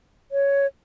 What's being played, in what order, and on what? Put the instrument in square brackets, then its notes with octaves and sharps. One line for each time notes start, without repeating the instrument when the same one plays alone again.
[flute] C#5